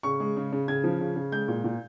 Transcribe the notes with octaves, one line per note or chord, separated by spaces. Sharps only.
C#3 C#6
G#3
C#3
C#3
C#3 G#6
F3
C#3
C#3
G#3 G6
A#2
A#2